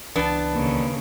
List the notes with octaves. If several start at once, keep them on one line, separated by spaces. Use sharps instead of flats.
C#2 E3 B3 D4 A5
D#2 C#3